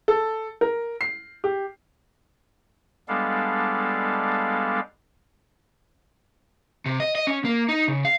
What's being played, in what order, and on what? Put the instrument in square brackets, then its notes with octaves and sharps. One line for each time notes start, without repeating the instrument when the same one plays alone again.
[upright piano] A4
A#4
C7
G4
[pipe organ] G3 G#3 B3 D4 A4 F5
[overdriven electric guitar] C3
D#5
D#5
C#4
A#3
D#4
C#3
F5